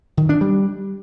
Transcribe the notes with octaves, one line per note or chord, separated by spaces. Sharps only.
D#3
D4
G3